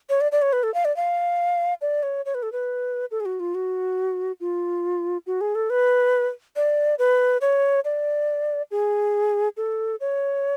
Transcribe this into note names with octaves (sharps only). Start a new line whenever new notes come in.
C#5
D5
D5
C#5
B4
A4
F5
D5
F5
D5
C#5
C#5
B4
A4
B4
A4
G#4
F#4
F4
F#4
F4
F#4
G#4
A4
B4
D5
B4
C#5
D5
G#4
A4
C#5